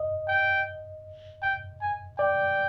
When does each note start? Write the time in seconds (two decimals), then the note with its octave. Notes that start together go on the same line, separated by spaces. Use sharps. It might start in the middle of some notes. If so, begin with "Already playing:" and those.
Already playing: D#5
0.28 G5
1.42 G5
1.81 G#5
2.19 D5 G5